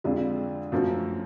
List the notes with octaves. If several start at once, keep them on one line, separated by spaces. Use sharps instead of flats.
F2 D3 G#3 D4 F4
F#2 F3 A3 C#4 F#4